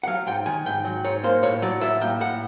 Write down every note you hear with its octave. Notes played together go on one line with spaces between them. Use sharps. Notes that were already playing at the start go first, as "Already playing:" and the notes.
F#5
F#3 F5
G#2 G5
D#3 G#5
G#2 G5
F#3
G#2 C#5
A#3 C5
A2 C#5
F#3 D5
A2 E5
A#3 G5
A2 F#5